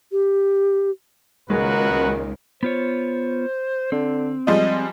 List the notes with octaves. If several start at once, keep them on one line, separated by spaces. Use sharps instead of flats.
G4
C#2 A#2 D#3 G#3 F#4 A#4 B4
B3 F4 C5 C#5
D3 C4
F3 G3 G#3 D#5